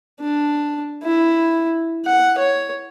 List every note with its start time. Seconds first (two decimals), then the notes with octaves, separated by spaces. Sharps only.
0.21 D4
1.03 E4
2.05 F#5
2.38 C#5